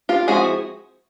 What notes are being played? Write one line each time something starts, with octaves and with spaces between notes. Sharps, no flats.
F4 G4
F3 G#3 C4 E4 F#4 G#4